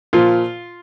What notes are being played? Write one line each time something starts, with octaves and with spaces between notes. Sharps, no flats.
A#2 F3 F4